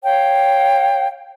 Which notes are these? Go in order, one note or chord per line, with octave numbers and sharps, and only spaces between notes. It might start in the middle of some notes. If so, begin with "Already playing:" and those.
C#5 F5 G5